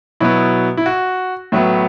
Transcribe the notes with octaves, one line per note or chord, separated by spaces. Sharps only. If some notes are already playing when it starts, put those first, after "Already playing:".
B2 F#3 B3 E4
E4
F#4
A2 F#3 B3 E5